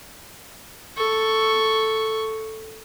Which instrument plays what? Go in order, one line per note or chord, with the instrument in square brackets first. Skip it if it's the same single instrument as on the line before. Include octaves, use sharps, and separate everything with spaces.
[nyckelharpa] A4 C#6